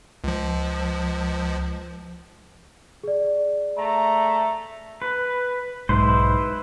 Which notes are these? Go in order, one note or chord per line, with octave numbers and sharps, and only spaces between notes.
C#2 F3
G#4 D5
A3 A#5
B4
B1 G#2 E4 B4 C5